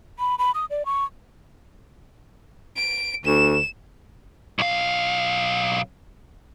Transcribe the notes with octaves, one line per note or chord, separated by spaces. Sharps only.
B5
B5
D#6
D5
C#6
D7
D2 E7
B1 F5